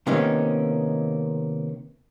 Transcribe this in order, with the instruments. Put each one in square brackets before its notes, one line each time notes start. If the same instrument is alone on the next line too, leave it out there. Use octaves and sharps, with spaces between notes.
[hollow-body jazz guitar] C3 D#3 A#3 B3 C#4 D#4